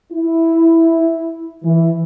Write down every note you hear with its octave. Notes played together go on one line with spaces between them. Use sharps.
E4
E3